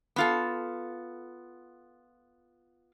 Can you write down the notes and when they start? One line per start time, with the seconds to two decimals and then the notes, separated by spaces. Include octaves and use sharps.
0.16 B3 F4 A4